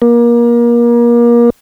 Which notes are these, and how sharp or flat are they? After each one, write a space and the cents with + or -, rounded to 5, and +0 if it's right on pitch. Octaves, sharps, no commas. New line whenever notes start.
A#3 +30